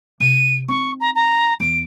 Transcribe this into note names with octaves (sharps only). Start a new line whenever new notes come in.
C3 D#7
C4 D#4 C#6
A#5
A#5
E2 D7